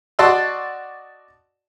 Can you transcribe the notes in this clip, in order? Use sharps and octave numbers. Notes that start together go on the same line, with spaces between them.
F#4 D5 D#5 A5 C6 E6